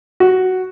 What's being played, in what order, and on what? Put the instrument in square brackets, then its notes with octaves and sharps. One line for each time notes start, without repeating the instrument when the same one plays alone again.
[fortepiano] F#4